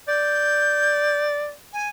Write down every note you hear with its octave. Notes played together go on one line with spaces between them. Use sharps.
D5 G6
G#5